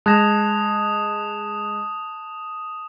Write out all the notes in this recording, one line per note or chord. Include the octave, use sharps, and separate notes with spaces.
G#3 A5 D#6 F#6 G#6 A#6 E7